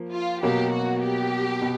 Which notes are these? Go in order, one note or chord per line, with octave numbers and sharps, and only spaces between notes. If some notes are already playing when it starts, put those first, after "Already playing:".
Already playing: F3 A#3
F4
B2 F#3 A#3 G4
F#4
G4
B2